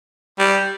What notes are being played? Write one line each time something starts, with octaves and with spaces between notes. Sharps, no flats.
G3